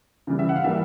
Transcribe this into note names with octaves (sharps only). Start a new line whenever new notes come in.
C#3 E3 G3
E5
F#5
F5
E3 G3 A#3 E5